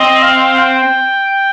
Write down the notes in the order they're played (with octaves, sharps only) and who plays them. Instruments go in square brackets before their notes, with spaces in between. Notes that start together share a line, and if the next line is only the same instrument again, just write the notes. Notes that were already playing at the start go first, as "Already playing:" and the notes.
Already playing: [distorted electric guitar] C4 [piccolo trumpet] D#5
[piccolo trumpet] F5
G5